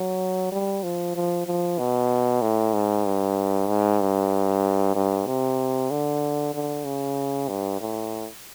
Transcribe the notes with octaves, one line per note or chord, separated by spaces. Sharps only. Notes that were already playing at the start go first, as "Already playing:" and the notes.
Already playing: F#3
G3
F3
F3
F3
B2
A2
G#2
G2
G#2
G2
G2
C3
D3
D3
C#3
G2
A2